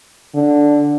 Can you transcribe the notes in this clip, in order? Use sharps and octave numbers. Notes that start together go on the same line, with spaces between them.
D3